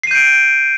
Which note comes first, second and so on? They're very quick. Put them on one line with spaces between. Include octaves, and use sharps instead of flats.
C7 D#7 G6 D7